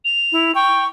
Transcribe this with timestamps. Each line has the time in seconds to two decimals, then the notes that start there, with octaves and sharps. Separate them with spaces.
0.05 F7
0.32 E4
0.55 G5 C#6